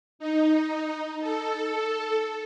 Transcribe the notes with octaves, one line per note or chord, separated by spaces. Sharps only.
D#4
A4